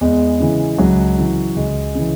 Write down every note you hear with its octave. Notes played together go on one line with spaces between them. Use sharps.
E2 G#3
C#3 E3
C#2 F#3
C#3 E3
C#2 G#3
C#3 E3